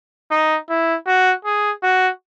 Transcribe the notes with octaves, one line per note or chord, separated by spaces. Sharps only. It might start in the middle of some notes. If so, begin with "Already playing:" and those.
D#4
E4
F#4
G#4
F#4